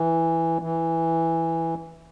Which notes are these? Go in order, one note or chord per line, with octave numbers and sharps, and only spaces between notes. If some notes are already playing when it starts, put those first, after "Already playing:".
Already playing: E3
E3